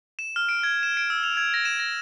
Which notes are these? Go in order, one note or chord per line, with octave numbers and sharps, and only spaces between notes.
E7
F6
D7
G#6
E7
D7
E6
F7
G#6
A#6
E7
A#6